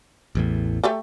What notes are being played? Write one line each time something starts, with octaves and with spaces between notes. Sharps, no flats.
A1 E2 A2
A3 G4 A4